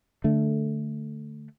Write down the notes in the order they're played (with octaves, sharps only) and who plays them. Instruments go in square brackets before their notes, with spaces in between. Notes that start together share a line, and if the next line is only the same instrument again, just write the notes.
[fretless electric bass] D3 A3